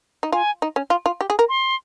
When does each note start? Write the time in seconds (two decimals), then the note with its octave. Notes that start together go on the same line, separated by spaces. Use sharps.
0.23 D#4
0.32 F4 G#5
0.62 D#4
0.76 C#4
0.90 F4
1.06 F4
1.21 G4
1.30 G#4
1.39 A#4
1.49 C6